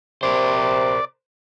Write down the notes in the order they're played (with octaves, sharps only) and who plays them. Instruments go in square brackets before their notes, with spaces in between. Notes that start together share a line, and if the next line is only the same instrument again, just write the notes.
[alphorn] C3 [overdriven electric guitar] A#4 C5 [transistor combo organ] D5